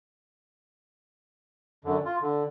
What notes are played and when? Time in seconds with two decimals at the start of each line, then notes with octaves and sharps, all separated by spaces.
1.85 F#2 D3
2.05 F4
2.21 D3